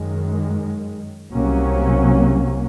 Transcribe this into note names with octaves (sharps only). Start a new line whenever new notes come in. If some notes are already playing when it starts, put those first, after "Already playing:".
Already playing: F#2 D#3 G#3
C2 C3 F#3 A#3 C#4